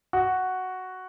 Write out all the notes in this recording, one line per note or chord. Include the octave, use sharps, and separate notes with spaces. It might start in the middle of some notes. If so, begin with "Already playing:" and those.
F#4